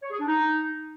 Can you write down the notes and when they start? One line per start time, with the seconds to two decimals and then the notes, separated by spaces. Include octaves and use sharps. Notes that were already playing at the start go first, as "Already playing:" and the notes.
0.02 C#5
0.11 G#4
0.19 D4
0.27 D#4